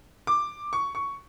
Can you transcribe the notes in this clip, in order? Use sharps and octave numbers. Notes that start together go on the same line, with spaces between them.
D6
C#6
C#6